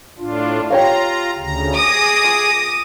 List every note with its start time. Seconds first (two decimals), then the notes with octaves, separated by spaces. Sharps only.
0.19 A2 D4 F4
0.70 F4 G4 C#5 F5 A#5
1.38 D2 C#3 A#5
1.75 G#4 D6 D#6 A#6
2.24 F4